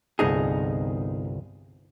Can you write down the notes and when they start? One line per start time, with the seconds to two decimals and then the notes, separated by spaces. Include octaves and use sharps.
0.19 G1 C2 B3 D#4 G#4 A5